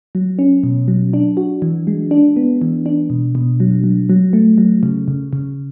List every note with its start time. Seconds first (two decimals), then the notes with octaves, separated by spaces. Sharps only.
0.15 F#3
0.39 C#4
0.63 B2
0.88 F#3
1.13 D4
1.37 F#4
1.62 E3
1.87 G#3
2.11 D4
2.36 B3
2.61 E3
2.86 D4
3.10 B2
3.35 B2
3.60 F#3
3.84 F#3
4.10 F#3
4.33 A3
4.58 F#3
4.83 C#3
5.08 C#3
5.33 C#3